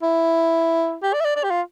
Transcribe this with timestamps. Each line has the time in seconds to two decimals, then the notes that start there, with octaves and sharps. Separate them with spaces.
0.02 E4
1.03 G4
1.13 D5
1.20 E5
1.24 D5
1.36 D5
1.44 G4
1.50 F4